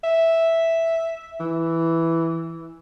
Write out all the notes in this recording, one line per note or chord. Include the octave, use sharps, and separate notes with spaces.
E5
E3